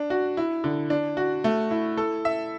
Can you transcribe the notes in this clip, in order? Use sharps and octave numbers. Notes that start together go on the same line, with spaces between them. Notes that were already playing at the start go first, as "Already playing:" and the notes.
Already playing: D4
F#4
E4
D3
D4
F#4
A3
E4
A4
E5